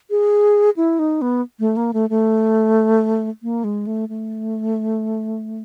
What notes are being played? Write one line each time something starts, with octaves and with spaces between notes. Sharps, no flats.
G#4
E4
D#4
B3
A3
A#3
A3
A3
A#3
G#3
A3
A3